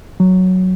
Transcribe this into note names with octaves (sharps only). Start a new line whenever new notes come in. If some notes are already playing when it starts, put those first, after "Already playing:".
F#3